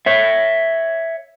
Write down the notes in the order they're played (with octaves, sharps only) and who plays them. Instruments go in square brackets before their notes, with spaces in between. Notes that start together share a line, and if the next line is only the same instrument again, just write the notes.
[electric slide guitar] C#5 E5